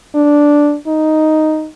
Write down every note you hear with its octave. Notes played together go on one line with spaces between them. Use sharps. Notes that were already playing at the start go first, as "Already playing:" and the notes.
D4
D#4